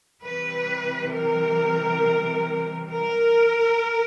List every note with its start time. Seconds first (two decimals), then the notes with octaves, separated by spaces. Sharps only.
0.22 C3 E3 G3 B4
1.11 A#4
2.90 A#4